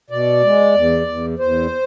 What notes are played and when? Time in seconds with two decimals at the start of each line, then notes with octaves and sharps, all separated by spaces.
0.10 B2 D5
0.43 G#3
0.75 E2
1.07 E2
1.39 E2 C5